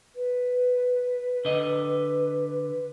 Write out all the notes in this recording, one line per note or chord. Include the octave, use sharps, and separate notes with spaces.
B4
D3 D#5